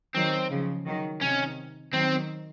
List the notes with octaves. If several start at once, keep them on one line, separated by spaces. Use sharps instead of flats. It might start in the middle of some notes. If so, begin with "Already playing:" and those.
D#3 F#3 C4
C#3 F3
D#3 F#3
C3 D#3 C#4
D#3 F#3 C4